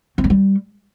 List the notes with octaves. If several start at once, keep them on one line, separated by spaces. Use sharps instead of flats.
C4
F#3
G3